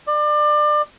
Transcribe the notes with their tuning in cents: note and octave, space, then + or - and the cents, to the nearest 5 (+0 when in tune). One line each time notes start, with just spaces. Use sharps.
D5 +30